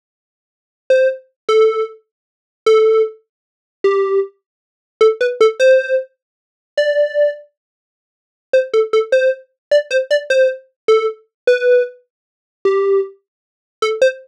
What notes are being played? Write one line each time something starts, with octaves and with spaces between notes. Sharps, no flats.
C5
A4
A4
G4
A4
B4
A4
C5
D5
C5
A4
A4
C5
D5
C5
D5
C5
A4
B4
G4
A4
C5